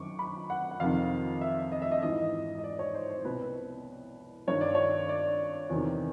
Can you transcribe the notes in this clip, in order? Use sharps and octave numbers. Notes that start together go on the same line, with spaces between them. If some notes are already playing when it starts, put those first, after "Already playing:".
Already playing: F#2 D#3 C#6 D6
B5
F#5
F#5
F2 C3 D#3 F5
E5
D#5
E5
D#5
G#2 E3 D#5
D#5
D5
C#5
C5
C5
C2 B2 B4
G2 D#3 C#5
D5
C#5
D5
E2 C3 D#3